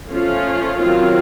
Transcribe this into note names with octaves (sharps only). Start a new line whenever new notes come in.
F3 A3 C#4 F4
D#3 F#3 C4 F4